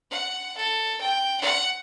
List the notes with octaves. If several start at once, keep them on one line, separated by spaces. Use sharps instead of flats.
F#5
A4
G5
F#5